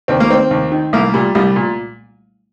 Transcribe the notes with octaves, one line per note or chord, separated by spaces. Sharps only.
D#2 C4
A#3
D#3 C4
D#2
D#3
C2 A#3
A#2 G3
C2 G3
A#2